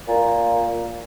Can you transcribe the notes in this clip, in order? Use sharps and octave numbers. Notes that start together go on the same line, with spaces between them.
A#2